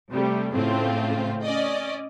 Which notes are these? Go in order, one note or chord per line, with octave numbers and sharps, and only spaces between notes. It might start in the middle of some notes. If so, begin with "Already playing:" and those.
C3 G3 A3
A2 C#3 A3 C4 F4
C#4 D5 D#5